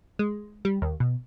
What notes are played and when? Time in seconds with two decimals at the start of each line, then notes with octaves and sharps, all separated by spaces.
0.19 G#3
0.65 G3
0.82 D#2
1.00 B2